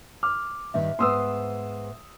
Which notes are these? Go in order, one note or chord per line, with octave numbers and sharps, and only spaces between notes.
D6 F6
G2 D#3 E5
G#2 B3 C5 C6 D#6 E6